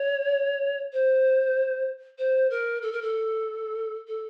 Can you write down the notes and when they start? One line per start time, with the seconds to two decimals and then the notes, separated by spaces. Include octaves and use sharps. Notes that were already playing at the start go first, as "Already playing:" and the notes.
Already playing: C#5
0.93 C5
2.18 C5
2.50 A#4
2.82 A4
2.92 A#4
3.02 A4
4.07 A4